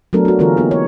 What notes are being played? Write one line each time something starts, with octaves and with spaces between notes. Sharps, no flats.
F#3 A3 B3 D4 A4 A#4
D4 F#4
D3 E3 B3 F4 G#4 A#4
A#3 B3 D#4 G4
C#5